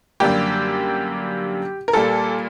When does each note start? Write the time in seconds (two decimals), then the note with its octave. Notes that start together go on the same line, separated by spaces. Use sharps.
0.20 F#2 D3 G3 A#3 G4
1.88 A#4
1.93 A#2 G3 A#3 A4